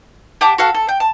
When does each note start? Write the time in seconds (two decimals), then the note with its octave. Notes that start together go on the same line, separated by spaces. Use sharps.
0.41 G4 F#5 A5 D6
0.58 F#4 A4 F5 F#5
0.75 A4
0.89 G5
1.00 A5